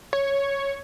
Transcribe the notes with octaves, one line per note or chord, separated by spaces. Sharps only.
C#5